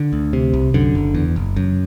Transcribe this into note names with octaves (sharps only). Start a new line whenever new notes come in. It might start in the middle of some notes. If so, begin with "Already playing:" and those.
Already playing: D3
D2
C3
C2
F#2 D3
F#1
E2
F#1
F#2